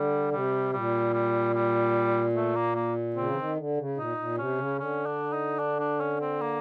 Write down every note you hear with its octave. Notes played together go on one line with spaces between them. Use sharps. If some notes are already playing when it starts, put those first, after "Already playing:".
Already playing: D3 G3
C3 G3
A#2 G3
G3
G3
A3
A#3
A#3
C#3 C4
E3
D#3
D3
C#3
A#2 D#4
A#2
C3 C#4
C#3
D3 C#4
D4
D#4
D4
D4
C#4
C4
A#3